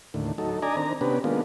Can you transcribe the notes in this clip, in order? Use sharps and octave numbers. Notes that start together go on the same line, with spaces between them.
D#2 A2 D3
F#3 D#4 A4
D4 D5 D#5 G#5 A#5
D#3 C4 D4 A#5
C3 B3 C#4 D4 G4 B4
D#3 G#3 A#3 B3 D4 F4